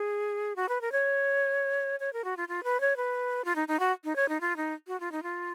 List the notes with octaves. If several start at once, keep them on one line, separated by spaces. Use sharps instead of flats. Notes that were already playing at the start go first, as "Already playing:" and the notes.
Already playing: G#4
F#4
B4
A#4
C#5
C#5
A#4
F#4
F4
F4
B4
C#5
B4
F4
D#4
D#4
F#4
D#4
C#5
D#4
F4
D#4
F#4
F4
D#4
F4